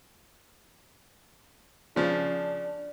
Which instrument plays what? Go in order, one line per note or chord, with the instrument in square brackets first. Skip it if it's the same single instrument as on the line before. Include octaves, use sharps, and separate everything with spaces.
[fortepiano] C#3 F3 [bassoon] D4